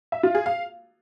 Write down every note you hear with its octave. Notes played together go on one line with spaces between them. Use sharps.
E5
F4
G#4
F5